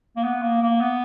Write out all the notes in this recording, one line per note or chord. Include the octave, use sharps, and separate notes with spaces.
A#3
B3
A#3
A#3
B3